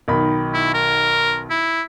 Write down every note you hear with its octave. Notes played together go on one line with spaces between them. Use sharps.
B1 D#3 B5
E4
A#4
E4